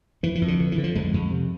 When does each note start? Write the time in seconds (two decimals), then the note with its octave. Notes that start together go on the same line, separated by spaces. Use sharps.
0.23 F2 E3
0.35 E3
0.42 F2
0.48 D3
0.59 D3 E3
0.72 E3
0.78 D3
0.84 F3
0.95 F2 G#3
1.13 F2
1.31 C3